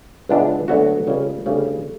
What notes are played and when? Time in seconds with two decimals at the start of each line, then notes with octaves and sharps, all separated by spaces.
0.29 C#2 C#3 E3 B3 D4
0.68 D2 D3 F#3 B3 F#4
1.07 C#2 C#3 G3 C#4
1.46 D2 C#3 G3